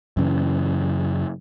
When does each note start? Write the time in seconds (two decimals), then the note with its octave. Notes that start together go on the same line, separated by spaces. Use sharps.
0.17 F#2 C#3 E3